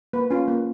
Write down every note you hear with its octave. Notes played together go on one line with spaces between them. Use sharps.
A#3 B4
C#4 F4
A#3